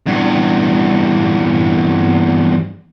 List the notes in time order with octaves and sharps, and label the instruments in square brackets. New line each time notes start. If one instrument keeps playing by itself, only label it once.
[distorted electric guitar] E2 G2